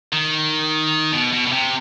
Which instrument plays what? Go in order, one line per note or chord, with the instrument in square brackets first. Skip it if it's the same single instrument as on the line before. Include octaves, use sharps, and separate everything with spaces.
[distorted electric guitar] D#3
B2
B2
B2
C3